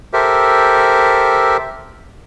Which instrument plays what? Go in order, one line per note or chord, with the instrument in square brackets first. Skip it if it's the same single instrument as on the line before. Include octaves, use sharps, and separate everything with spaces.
[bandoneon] G4 A4 A#4 C5 E5